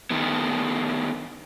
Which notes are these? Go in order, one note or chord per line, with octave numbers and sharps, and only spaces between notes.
D3 D#3 B3